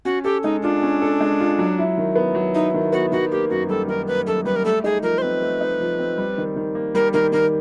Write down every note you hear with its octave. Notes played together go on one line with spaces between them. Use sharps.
C#4 F#4
G4 A4
G#3 D#4
D4 F4
C#4
A4
G#3
F4
F#3
E4
D#3
B3
F#3
D#4 E4
D#3
B3 F#4
D#3 F#4
A#3 G4
F#2 F#4
G3 A4
D#3 A#4
A#3 B4
F#2 A4
G3 B4
A#4
A3 A4
D#4 G#4
F3 A#4
C5
C4 B4
A3
D#4
F3
C4
G3
D#3
D#3
A#3
G3 A#4
D#3 A#4
D#3 A#4